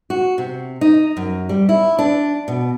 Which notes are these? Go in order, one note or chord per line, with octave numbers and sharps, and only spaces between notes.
F#4
C3
D#4
F#2
G3
E4
D4
B2